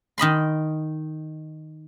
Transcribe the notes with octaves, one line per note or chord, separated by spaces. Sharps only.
D#3 D#5 B5 C6